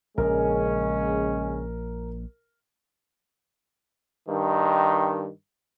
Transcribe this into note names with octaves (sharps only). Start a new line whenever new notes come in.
A#1 C#3 G#3 C#4 A#4
G2 D#3